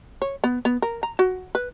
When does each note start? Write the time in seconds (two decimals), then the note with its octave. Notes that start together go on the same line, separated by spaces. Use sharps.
0.22 C#5
0.44 B3
0.65 B3
0.82 A#4
1.03 A#5
1.19 F#4
1.55 B4